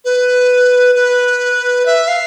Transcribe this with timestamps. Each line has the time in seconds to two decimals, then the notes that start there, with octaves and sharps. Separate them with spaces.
0.05 B4
0.95 B4
1.86 E5
2.08 F5